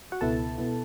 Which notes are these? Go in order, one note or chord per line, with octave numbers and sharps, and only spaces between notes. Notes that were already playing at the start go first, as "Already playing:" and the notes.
F#4 F#5
C#2 B2 B3 E4 A4 A5
B2 B3 E4